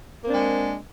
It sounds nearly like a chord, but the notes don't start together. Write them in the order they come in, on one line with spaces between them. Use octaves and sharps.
A#3 C4 D4 G#3